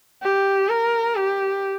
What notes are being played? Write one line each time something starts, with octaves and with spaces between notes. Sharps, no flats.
G4
A#4
G4